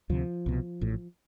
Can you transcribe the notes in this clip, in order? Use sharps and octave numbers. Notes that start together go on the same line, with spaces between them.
D2 C3 F3
C2 B2
A1 A2